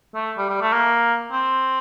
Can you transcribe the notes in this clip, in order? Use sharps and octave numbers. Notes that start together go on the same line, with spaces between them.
A3
G3
G3
A3
A#3
C4